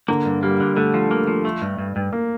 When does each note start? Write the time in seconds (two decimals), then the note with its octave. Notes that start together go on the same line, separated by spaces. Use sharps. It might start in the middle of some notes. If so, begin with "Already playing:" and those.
0.08 D3 A#3
0.25 G2
0.43 G3 A#3
0.60 D3
0.77 D3 A3
0.94 F3
1.11 A#3
1.27 F3
1.45 A3
1.62 G2
1.78 G2
1.96 G2
2.13 A#3